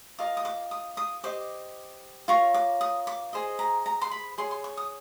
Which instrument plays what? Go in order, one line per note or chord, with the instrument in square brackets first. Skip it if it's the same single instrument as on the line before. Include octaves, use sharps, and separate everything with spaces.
[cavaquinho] F4 A#4 D#5 D6
D#6
D6
D#6
D#6
G4 C5 D#5 D6
F4 A#4 C#5 C#6
D6
D#6
D6
G#4 C5 D#5
A#5
A#5
C6
B5
G#4 C#5 C6
C6
C#6
D#6